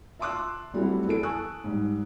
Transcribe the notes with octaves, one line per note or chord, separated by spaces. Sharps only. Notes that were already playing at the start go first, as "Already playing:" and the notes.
E5 A5 C6 D6 E6 F#6
F#3 G3 A3 C4 E4 F#4
E2 E4 A4 D7
G#5 A5 C#6 D#6 E6 F#6
G#2 G3